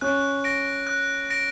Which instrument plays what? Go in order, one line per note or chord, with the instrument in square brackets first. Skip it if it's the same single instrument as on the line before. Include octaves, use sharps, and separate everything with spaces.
[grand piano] C#4 [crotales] F#6
[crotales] A#6 D7
F#6
A#6 D7